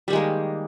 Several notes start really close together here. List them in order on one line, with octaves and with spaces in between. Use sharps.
G3 D#3 G#3 A#3